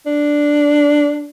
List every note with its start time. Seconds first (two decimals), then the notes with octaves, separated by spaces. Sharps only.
0.06 D4